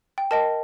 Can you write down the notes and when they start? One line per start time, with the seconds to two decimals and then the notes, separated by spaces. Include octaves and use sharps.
0.18 G5
0.31 A#4 D#5 G5 A5